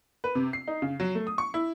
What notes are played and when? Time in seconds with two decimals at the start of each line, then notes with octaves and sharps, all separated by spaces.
0.24 B4
0.35 C3
0.53 C7
0.67 D#4
0.82 C#3
1.00 F#3
1.15 A3
1.27 D#6
1.38 C#6
1.54 E4